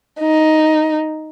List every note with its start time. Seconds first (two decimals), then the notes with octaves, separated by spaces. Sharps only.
0.19 D#4